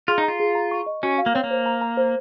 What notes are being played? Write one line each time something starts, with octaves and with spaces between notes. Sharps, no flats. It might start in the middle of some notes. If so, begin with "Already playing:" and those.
F4 G#4
D#4
F4 A#5
G#4
A#5
C#6
D#5
C#4 F#4
F5
A#3
C4 C#5
A#3
C5
A#5
A#5
C5